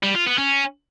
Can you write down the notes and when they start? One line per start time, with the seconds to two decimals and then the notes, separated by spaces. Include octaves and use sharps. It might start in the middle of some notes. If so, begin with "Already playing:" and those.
0.03 G3
0.15 F4
0.27 B3
0.38 C#4